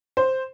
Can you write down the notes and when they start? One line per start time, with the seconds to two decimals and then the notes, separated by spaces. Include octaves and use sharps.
0.17 C5